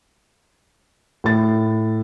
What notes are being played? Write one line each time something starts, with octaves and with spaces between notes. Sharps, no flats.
A2 A6